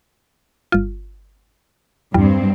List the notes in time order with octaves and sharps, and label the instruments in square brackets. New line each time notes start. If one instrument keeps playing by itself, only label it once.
[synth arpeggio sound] G1 F4
[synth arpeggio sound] E2 G3 [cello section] G2 C4